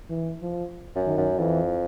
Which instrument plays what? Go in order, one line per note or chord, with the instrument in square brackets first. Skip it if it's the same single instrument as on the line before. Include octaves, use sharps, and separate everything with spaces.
[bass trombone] E3
F3
[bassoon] F#2
[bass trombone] D#3
[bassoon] F#2
[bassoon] F2 [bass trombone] E3